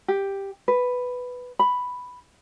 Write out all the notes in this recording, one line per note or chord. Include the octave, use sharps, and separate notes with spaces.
G4
B4
B5